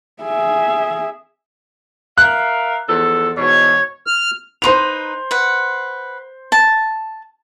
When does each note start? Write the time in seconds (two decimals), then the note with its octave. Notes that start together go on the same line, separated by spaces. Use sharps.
0.22 G#4 E5
2.18 A#4 E5 F5 F#6
2.89 E2 F3 A4
3.37 E2 G#2 B2 C#5
4.07 F6
4.62 D#4 E4 B4 C5 C6 F7
5.31 B4 F#5
6.52 A5